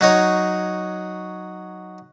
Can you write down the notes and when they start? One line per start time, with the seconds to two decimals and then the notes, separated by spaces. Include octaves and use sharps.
0.01 F#3 D#4 C#5